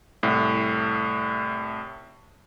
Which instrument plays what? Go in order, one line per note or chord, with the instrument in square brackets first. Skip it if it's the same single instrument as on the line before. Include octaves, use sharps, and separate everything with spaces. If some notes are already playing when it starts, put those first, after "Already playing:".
[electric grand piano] C2 A2